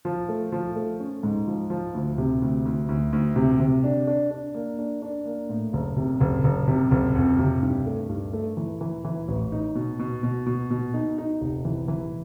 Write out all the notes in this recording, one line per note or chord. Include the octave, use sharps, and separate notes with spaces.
F3
A3
F3
A3
C#4
G#2
F3
F3
D2
C3
D2
D2
D2
D2
C3
C3
D4
D4
D4
A#3
D4
D4
A#3
A2
F#1
C3
F#1
F#1
C3
F#1
F2
C3
G2
A3
G2
A3
E3
E3
E3
A1
D#4
B2
B2
B2
B2
B2
D#4
D#4
F1
E3
E3